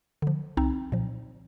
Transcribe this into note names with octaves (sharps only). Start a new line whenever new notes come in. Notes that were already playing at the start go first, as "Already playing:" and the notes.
D3 F3
C2 C4 D#4
A#2 F3